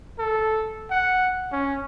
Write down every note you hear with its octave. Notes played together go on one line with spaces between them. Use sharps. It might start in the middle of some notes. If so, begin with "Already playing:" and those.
A4
F#5
C#4